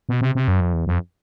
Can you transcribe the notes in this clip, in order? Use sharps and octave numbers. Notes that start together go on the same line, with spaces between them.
B2
C3
C3
F#2
F2
E2
F2